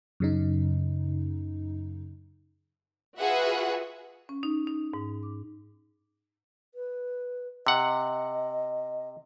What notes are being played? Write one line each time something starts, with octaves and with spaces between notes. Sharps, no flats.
F#2 C#3 D#4
F4 F#4 G#4 B4 E5 F#5
C#4
D#4
D#4
G#2
D6
B4
C3 D#5 F#5